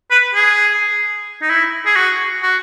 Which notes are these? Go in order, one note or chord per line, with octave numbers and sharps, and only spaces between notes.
B4
G#4
D#4
E4
G#4
F#4
F#4